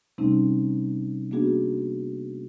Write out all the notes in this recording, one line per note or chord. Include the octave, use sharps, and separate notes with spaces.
C3 G3 A3 C4 C#4 D#4
A#3 B3 D4 F#4 G#4